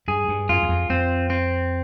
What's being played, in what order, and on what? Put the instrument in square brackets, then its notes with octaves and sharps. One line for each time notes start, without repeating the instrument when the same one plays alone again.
[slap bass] G2 [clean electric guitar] G#4
[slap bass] G2
[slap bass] F#2 [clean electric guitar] F4
[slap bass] E2
F2
[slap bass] F2 [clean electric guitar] C4
[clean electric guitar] C4